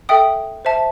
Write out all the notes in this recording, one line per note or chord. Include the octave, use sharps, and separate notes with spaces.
A4 E5 G5 D#6
C5 E5 A5